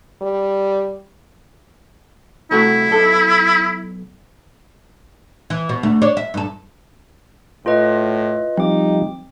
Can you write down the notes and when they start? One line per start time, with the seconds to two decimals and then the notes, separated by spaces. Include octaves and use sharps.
0.21 G3
2.51 C2 A3 E4 F#4
2.89 B1 A4
5.50 E3
5.69 B2
5.83 D2 A3
6.02 D4 C#5
6.17 E5
6.34 G2 A4
7.66 A2 F4 B4 D#5
8.57 F3 G3 C4 D#4 D6